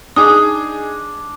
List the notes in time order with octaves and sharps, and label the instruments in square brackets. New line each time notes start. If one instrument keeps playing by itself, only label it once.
[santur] D4 [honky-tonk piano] D#4 G#4 [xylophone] D#6